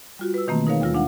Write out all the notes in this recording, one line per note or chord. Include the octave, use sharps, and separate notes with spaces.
G3 F4 F#4
B4 E6
B2 D#3 E3 A3 A#3 C4
D#4 G#4 A#4 B4 C#5 F5
D#2 G3 G#3 F4 E6 A#6
G#3 D4 F5 F#5